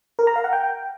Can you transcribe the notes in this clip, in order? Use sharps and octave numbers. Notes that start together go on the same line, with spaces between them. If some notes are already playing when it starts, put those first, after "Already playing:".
A#4
A#5
F5
F#5
G5